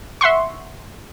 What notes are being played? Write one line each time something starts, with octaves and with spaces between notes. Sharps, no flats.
E5 F#5 C6 C#6